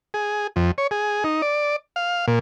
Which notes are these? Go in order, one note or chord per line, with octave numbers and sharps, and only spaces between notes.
G#4
F2
C#5
G#4
D#4
D5
F5
A#2